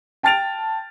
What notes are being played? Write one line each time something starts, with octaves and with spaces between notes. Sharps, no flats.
G5 A5 F6 A6 D7 F7